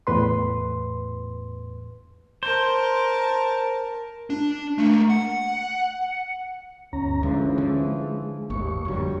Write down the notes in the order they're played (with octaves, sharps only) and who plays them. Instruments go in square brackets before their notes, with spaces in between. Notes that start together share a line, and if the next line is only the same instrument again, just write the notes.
[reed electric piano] E2 A2 B4 C6
[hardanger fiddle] A#4 A5 [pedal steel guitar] C5
[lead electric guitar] D4
A3 A#3
F#5
[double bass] G1 [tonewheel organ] D2 C#4 A#5
[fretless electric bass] D3 [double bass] E3 F3 [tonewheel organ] G#3 C#4
[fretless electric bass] D3
[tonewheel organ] G#3
[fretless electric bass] G#1 [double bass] D#2 [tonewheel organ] A#3 C#6
[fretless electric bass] F2 D3 [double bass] F#3 G3